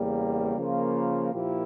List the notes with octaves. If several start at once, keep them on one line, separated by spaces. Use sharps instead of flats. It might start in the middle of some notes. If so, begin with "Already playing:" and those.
Already playing: E2 C#3 G3 A#3
C#3 F3 A#3 F4
A#2 F3 A#3 E4 G4